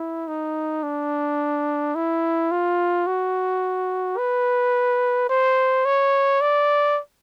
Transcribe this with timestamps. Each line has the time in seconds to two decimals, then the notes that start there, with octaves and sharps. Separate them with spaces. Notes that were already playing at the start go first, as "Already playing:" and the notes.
Already playing: E4
0.27 D#4
0.83 D4
1.95 E4
2.51 F4
3.07 F#4
4.18 B4
5.30 C5
5.85 C#5
6.41 D5